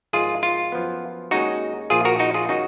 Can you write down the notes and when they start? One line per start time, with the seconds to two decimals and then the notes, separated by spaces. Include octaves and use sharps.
0.13 G#1 G#2 F3 G#3 F4 G#4
0.43 F4
0.72 F#2 F3 B3
1.31 D#2 D#3 G#3 C#4 D#4 F#4
1.90 A#1 A#2 F3 F4 G#4
2.05 F#4 A#4
2.19 D#4 F#4
2.34 F4 G#4
2.49 D#3 G#3 C#4 D#4 F#4